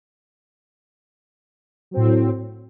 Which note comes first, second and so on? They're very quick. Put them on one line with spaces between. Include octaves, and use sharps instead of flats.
F#3 C4 A2